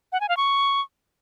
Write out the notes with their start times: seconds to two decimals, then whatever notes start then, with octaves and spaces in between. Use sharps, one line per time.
0.12 F#5
0.21 G#5
0.29 F5
0.37 C#6